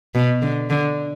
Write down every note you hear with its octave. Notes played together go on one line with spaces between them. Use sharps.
B2
D3
D3